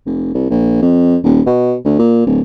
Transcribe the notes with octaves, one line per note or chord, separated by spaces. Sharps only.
F1
C2
A#1
F2
D#1
B2
D2
A#2
D1